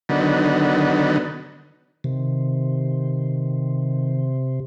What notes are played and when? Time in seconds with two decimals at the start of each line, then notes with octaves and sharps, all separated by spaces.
0.09 D3 D#3 F#3 B3
2.04 C3 D#3